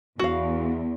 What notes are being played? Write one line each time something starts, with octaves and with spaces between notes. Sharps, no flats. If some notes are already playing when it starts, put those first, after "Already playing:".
E2 F#4 F5